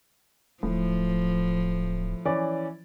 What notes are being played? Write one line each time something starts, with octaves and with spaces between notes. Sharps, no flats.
D1 A2 F3
E3 C#4 D5